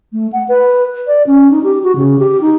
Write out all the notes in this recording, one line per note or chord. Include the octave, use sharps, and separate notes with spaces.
A3
F#5
B4
D5
C#4
D#4
G4
F#4
C#3
G4
D#4